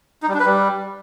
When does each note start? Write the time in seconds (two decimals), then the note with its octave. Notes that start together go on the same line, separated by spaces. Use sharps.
0.23 D#4
0.28 G3
0.34 D4
0.40 B4
0.46 G3